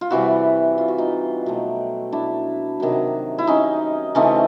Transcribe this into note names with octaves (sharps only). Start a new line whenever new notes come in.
F4
C3 E3 G3 E4 F#4
F4
F#4
D#4 F4
B2 F#3 A3 C4
D4 E4
C3 D#3 F#3
E4
C#4 D#4
C#3 E3 A3 C4 C#4 D#4